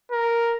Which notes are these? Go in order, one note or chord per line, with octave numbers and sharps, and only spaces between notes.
A#4